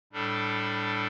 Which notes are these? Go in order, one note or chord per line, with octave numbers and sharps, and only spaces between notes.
A2 G3 D4 A4